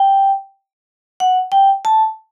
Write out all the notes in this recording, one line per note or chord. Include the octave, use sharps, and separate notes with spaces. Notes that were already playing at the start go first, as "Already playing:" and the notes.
Already playing: G5
F#5
G5
A5